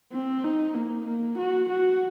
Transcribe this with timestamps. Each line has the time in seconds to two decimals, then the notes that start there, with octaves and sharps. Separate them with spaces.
0.13 C4
0.44 D#4
0.74 A#3
1.06 A#3
1.38 F#4
1.69 F#4